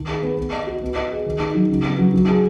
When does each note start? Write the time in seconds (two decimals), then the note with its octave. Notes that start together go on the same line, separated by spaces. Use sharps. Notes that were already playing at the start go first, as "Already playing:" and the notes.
Already playing: D#3
0.08 G#4
0.23 B3
0.37 B3
0.53 D#5
0.67 F#4
0.82 B3
0.96 D#5
1.11 G#4
1.26 D#3
1.40 D#4
1.55 F#3
1.70 C#3
1.84 B3
1.99 F#3
2.14 F#3
2.29 G#4